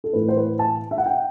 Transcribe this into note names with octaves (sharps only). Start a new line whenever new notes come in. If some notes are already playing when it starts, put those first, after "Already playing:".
A4
A2 E3 B4
C5
B4
A5
E5
F#5
G5